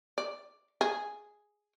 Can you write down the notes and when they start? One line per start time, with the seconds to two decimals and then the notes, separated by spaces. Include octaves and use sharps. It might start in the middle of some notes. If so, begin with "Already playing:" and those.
0.18 D5
0.81 G#4